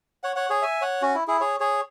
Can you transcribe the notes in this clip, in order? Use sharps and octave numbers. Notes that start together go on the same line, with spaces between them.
C#5 F#5
C#5 F#5
G#4 C#5
E5 G#5
C#5 F#5
C#4 F#4
E4
E4 G#4
G#4 C#5
G#4 C#5